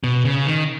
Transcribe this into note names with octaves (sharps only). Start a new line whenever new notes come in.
B2
C#3
D#3